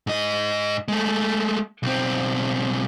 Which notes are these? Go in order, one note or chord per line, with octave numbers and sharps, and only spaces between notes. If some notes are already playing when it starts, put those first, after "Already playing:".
G#2 D#5
G#3 A3
B1 C4